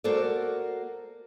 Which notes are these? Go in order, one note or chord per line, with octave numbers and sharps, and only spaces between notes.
A#3 F#4 A4 A#4 C5 D5